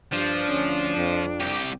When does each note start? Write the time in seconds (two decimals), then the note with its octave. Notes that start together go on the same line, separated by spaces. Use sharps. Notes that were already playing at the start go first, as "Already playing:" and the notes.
0.13 G2 F3 D4
0.48 D2 C#4
0.96 F2
1.40 C2 G4